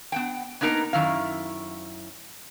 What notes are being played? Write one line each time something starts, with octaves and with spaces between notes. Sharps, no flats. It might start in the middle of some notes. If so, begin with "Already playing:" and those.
B3 F#5 G5
A#3 B3 D#4 A#4 A#5
F#2 D#3 E4 F5